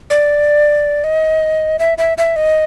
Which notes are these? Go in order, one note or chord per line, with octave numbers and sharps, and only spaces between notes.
D5
D#5
E5
E5
E5
D#5